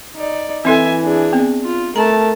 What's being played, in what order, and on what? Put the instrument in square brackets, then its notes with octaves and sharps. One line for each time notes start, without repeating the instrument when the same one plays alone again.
[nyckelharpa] D#4 D5
[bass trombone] E3 [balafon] C4 E4 A4 [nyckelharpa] E5 G#5
[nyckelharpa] D4 G#4
[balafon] B3 C4
[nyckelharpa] F4
[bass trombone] A3 [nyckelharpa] A#4 A5 [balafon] A#5